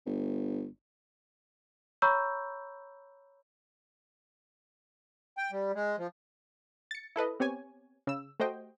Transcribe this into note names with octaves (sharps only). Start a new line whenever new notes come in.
G1
C#5 A#5 B5 C#6 E6 G6
G5
G3
G#3
F3
A6 C#7
E4 A4 B4 D#5
B3 C4 G4 C#5 G#5
C#3 E6
A3 F#4 G4 C5 D#5 G5